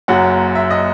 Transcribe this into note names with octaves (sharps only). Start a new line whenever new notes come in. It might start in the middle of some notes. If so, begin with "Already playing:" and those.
F#1 F#2 F#3 F#5
E5
D#5